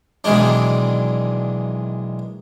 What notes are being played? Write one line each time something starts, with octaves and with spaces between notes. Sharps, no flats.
B1 D#3 E3 G#3 D4